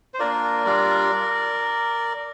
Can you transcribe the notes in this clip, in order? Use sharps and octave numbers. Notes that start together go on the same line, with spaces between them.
C5
A#3 D4 F4 A#4 D5
G3 D4 F4